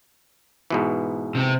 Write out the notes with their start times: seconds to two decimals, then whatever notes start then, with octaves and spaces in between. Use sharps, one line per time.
0.70 G#2 B2 E3
1.35 C3 C4